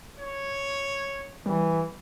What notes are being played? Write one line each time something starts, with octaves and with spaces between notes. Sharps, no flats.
C#5
E3 G3